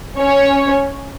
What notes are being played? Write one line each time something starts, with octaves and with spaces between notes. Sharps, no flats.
C#4 C#5